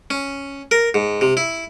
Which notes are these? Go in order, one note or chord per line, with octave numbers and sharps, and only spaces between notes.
C#4
A#4
G#2
C3
E4